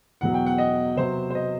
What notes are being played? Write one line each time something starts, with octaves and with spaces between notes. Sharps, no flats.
E2 B2 F#3 F#5
G5
F#5
D#5
C3 F#3 B3 C5
C5
D#5